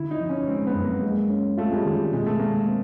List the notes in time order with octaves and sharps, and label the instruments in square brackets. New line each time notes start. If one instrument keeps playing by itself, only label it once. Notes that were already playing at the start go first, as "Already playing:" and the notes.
Already playing: [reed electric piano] D3 [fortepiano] E4
[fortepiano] D#4
[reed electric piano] F3
[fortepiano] C#4
[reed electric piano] G#3 [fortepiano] C4
[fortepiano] B3
[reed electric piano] F#2
[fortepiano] A#3
[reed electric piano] G#3
C#4
[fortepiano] A3 [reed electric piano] F4
[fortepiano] G#3
G3
[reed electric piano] D#3
[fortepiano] G3
[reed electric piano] B2 [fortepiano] G#3
[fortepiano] A3
[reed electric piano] G#3 [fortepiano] A#3
[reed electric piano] C4